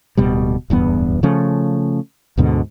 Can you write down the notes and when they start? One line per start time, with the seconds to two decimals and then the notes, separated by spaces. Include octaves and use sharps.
0.17 D1 B2 G3
0.70 D1 E2 G2 B3
1.23 C#3 F3 A3 C#4
2.37 D2 G#2 B2 D3